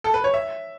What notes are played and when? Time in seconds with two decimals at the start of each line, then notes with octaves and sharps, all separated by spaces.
0.04 A4
0.14 B4
0.24 C#5
0.34 E5